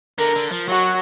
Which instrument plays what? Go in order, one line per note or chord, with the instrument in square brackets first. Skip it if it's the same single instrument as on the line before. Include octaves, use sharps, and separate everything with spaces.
[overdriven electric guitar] D3 [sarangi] A#4
[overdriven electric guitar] D3
F3
[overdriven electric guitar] F#3 [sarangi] F#4